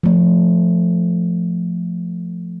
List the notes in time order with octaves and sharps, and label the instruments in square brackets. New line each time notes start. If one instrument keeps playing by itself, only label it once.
[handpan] F3 A3